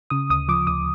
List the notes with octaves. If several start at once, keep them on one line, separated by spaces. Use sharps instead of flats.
C#3 D#6
D2 D#6
F3 D6
D2 D#6